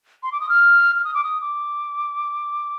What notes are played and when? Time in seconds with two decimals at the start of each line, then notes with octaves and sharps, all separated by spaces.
0.23 C6
0.32 D6
0.40 D#6
0.49 F6
0.95 F6
1.04 D#6
1.14 D6
1.24 D#6
1.41 D6